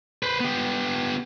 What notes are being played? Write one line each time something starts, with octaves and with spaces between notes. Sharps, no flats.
B4 C5
B3 G4